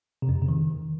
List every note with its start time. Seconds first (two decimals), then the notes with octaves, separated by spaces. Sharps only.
0.22 C3
0.29 F2
0.35 C3
0.42 C#3
0.48 D#3